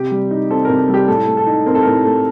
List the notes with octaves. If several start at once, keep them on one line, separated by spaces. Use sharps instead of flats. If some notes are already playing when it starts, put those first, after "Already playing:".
Already playing: C3 G4
G3
D#4
C4 A4
C3 A#4
A4
G3 G4
A2 A4
A3
A4
D#4
C4 A#4
A4
A2 A#4
A3